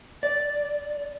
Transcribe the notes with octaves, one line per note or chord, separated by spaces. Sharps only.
D5